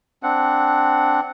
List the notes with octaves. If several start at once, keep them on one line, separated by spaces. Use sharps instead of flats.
C4 D4 F#5